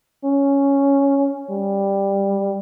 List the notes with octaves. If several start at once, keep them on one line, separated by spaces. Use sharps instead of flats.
C#4
G3